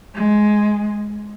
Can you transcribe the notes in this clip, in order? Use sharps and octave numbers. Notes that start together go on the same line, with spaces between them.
G#3